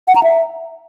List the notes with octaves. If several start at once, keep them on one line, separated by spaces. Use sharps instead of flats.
F#5
A#5
E5